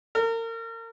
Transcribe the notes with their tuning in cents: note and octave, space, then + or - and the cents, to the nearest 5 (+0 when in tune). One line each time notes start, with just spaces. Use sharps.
A#4 -35